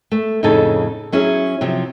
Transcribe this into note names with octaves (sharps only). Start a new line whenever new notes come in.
A3
F2 A2 C#3 D#4 A4 G#5
F#3 C#4 E4 G#4
C3 F3 F#3